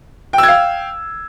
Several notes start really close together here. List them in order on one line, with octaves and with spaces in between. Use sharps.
G5 E6 G#6 F5